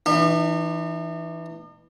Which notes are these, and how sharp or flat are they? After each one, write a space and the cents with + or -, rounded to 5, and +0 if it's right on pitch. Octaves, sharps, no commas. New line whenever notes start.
E3 +0 D#4 -45